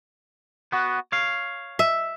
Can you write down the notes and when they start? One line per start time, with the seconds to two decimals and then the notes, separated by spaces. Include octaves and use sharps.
0.72 B3 F#4
1.12 C#5 F5
1.79 E5